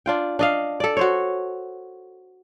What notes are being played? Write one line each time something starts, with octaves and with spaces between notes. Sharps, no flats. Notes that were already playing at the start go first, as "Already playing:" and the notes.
D4 F4 G5
D4 D#5 F5
A4 D5
F#4 C5 C#5